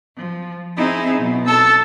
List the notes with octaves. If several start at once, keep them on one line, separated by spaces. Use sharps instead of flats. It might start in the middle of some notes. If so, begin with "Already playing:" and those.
F3
C4 D#4 E4 G#4
B2 F#3
A4 A5 E6